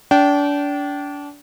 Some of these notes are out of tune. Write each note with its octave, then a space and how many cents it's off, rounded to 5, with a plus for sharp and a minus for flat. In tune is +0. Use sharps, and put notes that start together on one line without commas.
D4 -30 G5 -25